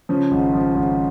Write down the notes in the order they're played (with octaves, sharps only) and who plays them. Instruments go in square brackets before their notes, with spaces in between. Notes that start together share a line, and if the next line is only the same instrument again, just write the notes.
[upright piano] C#3 C#4 [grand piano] F3
[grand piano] G#1
F3
G#1